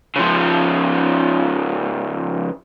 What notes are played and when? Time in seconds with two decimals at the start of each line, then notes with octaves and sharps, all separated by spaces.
0.16 C#3 F3